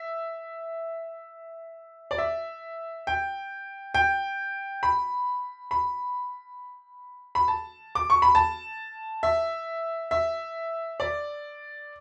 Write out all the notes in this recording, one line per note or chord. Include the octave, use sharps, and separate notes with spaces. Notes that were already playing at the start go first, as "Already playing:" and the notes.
Already playing: E5
D5
E5
G5
G5
B5
B5
B5
A5
D6
C#6
B5
A5
E5
E5
D5